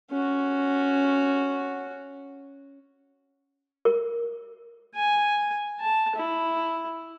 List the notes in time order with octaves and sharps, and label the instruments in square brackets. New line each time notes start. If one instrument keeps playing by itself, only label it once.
[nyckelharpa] C#4 F#4
[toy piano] A#4
[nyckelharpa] G#5
A5
E4